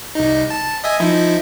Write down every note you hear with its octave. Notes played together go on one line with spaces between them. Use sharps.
C2 D#4
A5
D#5 E5 G#5
F3 D#4 E4